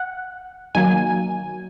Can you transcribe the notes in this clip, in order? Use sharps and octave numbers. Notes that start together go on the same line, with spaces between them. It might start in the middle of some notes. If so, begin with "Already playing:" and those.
Already playing: F#5
D#3 F#3 A#3 G#5